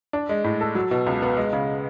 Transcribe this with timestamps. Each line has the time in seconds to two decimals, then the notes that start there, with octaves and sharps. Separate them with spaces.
0.13 D4
0.29 G#3
0.44 A2
0.61 A4
0.75 F#3
0.91 B2
1.07 C#2
1.22 B3
1.37 G#3
1.53 C#3